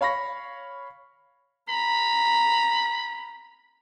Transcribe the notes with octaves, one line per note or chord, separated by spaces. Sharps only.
C#5 F5 B5 C#6 A#6
A#5 B5